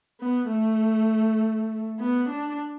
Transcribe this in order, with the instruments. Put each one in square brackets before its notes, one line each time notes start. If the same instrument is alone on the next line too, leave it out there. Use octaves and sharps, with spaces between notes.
[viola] B3
A3
B3
D4